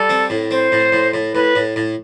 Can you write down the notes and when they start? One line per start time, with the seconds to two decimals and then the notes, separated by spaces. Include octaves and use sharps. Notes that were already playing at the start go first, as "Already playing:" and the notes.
Already playing: G3 A4
0.09 C4
0.30 A2
0.51 C4 C5
0.72 A2
0.92 A2
1.14 A2
1.34 A2 B4
1.55 A2
1.76 A2